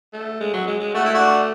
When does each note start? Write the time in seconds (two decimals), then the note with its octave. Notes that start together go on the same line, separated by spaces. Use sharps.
0.13 A3
0.40 G#3
0.53 F#3
0.67 G#3
0.80 G#3
0.95 A3 F#4
1.05 E4
1.14 D4 F#4